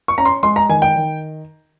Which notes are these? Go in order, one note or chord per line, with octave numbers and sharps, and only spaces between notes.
C#6
C#4 A#5
C6
G#3 C6
A#5
D#3 G#5
G5
D#3